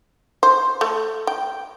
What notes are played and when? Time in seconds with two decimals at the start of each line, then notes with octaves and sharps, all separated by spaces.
0.43 C5
0.81 A3
1.27 G5